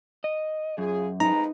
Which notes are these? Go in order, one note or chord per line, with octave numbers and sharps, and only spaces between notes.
D#5
F#2 C#3 F4 G#4
F2 G#3 D#4 B4 A#5